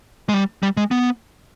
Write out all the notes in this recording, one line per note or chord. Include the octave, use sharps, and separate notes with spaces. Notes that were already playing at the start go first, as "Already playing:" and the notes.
G#3
G3
G3
G#3
B3